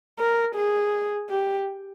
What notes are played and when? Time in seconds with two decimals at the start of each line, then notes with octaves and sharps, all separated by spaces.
0.19 A#4
0.56 G#4
1.30 G4